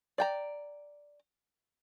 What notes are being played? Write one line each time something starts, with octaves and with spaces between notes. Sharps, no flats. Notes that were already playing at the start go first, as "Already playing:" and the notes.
D5 G5 A#5